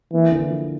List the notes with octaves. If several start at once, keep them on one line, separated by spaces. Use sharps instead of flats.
E3 A#3
D3
F3